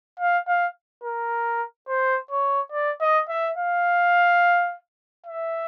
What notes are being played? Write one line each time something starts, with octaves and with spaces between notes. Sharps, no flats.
F5
F5
A#4
C5
C#5
D5
D#5
E5
F5
E5